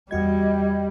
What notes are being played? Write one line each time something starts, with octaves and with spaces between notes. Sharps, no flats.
E2 G3 F#4 D#5 G#6